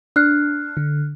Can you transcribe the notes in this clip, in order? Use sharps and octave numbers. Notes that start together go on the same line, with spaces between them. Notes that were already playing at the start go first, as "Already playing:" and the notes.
D4 F6 F#6 C7
D3